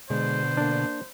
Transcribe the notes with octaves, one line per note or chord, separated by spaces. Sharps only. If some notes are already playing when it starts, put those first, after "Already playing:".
B2 D3 G#3 C5
A#3 D4